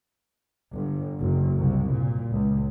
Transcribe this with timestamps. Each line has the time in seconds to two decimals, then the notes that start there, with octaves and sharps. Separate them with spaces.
0.72 G1
1.21 F#1
1.59 C2
1.91 A#2
2.34 C#2